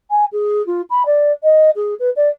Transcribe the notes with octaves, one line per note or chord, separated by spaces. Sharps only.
G#5
G#4
F4
B5
D5
D#5
G#4
B4
D5